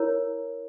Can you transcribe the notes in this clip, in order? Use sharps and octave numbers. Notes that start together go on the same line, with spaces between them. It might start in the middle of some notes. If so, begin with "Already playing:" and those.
Already playing: E4 A#4 C#5